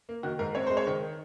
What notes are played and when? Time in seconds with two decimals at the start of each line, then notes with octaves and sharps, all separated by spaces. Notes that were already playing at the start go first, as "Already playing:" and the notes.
0.09 A#3
0.23 D#3 F#4
0.39 G#2 A#4
0.55 C4 C#5
0.67 G#3 C5
0.77 C#5
0.87 D#3